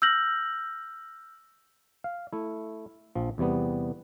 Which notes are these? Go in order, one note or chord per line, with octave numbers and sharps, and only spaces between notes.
E6 F6 G6 A#6 F#7
F5
A3 E4
A#1 F3
E2 C3 G3 B3